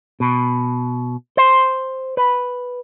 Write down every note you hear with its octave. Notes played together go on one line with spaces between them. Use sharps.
B2
C5
B4